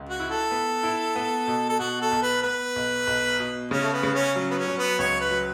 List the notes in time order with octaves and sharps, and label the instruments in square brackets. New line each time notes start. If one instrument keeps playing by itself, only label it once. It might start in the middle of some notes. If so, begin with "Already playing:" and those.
Already playing: [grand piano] C#2
[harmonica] F#4
[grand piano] E4
[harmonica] A4
[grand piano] B3
E4
B3
B2
[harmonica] A4
[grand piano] B2 [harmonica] F#4
[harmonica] A4
[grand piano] B1
[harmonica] B4
[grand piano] B3 [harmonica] B4
[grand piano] B1
B1
B2
[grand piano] C#3 [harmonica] C#4
[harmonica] A3
B3
[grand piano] C#3
[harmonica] C#4
[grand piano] F#3
[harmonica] B3
C#4
[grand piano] F#3
[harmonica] B3
[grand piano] C#2 [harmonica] C#5
[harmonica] B4
[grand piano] F#3